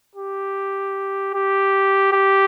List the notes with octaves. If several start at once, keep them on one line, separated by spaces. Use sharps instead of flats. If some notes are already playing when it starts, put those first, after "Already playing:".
G4
G4
G4